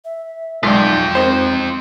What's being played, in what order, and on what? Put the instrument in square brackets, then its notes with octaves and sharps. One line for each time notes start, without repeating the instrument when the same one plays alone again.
[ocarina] E5
[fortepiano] B1 D5 [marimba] G#3 [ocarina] D#4 [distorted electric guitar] F4 G5
[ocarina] C4 [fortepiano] D#4 C5